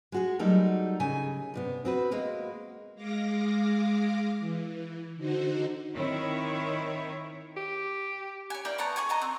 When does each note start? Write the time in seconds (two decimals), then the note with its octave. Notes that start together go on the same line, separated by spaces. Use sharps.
0.12 G#3 F#4 G#4
0.39 F#3 G3 A3 D#4 A4 A#4
1.00 C#3 G#5
1.54 G2 C3 B3
1.85 C4 F#4 B4
2.11 G#3 A#3 F#4
2.95 G#3 F5 D6 A#6
4.40 E3
5.16 D3 D#4 F#4 C5
5.94 D#3 C4 E4 C#5
7.57 G4
8.50 C#5 G#5
8.65 A#3 E4 D5 G5
8.78 B3 C#5 A5 A#5
8.96 G#4 G#5 C#6 D6
9.09 C#5 D#5 A#5
9.21 C4